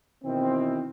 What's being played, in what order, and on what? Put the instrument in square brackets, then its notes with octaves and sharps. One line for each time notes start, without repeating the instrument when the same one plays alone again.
[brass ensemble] B2 D#3 E3 C4